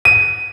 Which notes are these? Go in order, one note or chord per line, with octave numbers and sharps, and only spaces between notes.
D#7